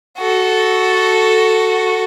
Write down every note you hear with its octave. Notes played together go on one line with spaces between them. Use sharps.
F#4 A4